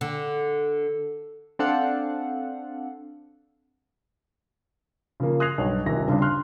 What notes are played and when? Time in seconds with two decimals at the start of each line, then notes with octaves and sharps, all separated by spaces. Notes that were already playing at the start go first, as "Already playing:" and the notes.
0.01 D3
1.59 C4 D4 A4 F5 F#5
5.20 C#3 F3 A#3
5.40 D#6 F#6 G#6 A#6 C7 F7
5.58 B1 G2 B2
5.86 D#1 G#1 C3 D#3 A#6
6.08 G2 C#3 C4 D4
6.22 C6 F6 F#6